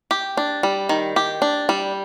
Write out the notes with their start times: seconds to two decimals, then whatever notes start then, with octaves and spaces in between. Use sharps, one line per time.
0.11 G4
0.37 D4
0.63 G3
0.89 D#3
1.16 G4
1.42 D4
1.69 G3